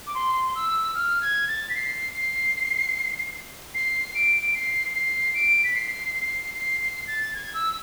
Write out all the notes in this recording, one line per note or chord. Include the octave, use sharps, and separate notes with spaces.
D6
C6
E6
F6
G#6
A6
B6
C7
C7
C7
D7
C7
C7
D7
B6
C7
C7
C7
C7
A6
G#6
E6